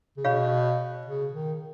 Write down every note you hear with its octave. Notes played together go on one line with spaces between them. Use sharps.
C#3
B2 G#4 C#5 F5 B5
C#3
D#3